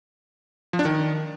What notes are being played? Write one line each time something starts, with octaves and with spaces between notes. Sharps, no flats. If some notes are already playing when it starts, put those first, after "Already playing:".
F3
D4
D#3